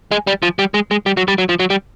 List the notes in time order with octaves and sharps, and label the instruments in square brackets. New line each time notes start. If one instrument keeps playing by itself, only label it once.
[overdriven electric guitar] G#3
G3
F3
G3
G#3
G#3
G3
F#3
G3
F#3
F3
F#3
G3